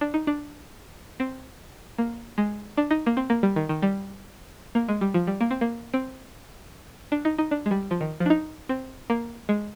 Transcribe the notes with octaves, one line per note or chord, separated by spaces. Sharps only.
D4
D#4
D4
C4
A#3
G#3
D4
D#4
A#3
C4
A#3
G3
D#3
D#3
G3
A#3
G#3
G3
F3
G3
A#3
C4
A#3
C4
D4
D#4
D#4
D4
G#3
G3
F3
D#3
F3
D4
D#4
C4
A#3
G#3